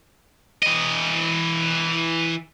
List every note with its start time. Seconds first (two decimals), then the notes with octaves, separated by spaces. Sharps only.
0.63 E3 D#5